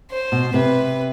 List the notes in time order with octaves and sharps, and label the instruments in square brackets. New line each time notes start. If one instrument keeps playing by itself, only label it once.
[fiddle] C5
[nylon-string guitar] B2
[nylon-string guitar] C3 [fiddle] B4